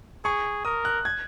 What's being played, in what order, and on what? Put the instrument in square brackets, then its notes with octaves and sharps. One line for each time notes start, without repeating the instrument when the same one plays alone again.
[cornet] G#4 [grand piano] C#6
[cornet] A#4 [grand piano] D#6
[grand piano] F#6
G#6